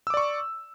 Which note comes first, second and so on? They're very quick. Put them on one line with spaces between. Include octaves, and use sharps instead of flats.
E6 D6 D5 C#6